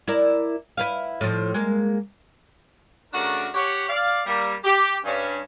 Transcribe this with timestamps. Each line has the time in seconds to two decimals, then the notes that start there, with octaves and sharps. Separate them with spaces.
0.08 E4 A#4 D5
0.77 E4 B4 F5
1.21 A2 F3
1.54 G#3 A#3
3.13 C#3 A3 D4 F#4 A#4
3.54 G4 C#5 F#5
3.88 D5 F5
4.26 G3 A#3
4.64 G4
5.05 G2 C#4